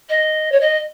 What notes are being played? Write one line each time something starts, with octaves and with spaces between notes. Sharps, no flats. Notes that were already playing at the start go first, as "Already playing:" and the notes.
D#5
C#5
D#5